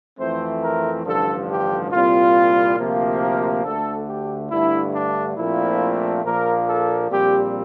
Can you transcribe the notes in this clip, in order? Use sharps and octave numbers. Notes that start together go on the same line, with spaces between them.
F2 E3 A3 C4 C5
A#4
A1 G2 D3 F3 A4
G4
C2 A#2 G3 C4 F4
D2 C3 F3 A#3
A#4
D2 D3 A3 A4
G4
G2 D3 A3 E4
D4
A#1 A#2 F3 A3 C4 E4
A#1 A#2 F3 A#3 A#4
A4
A#1 A#2 G3 C4 G4